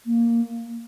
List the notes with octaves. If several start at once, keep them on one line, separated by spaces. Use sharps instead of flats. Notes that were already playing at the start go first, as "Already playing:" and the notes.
A#3